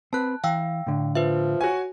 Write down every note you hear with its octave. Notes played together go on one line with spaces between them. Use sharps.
C4 B4 A5 F#6
E3 F5 G5 E6
A2 D3
F3 B4 E5
F#4 C#5 G#5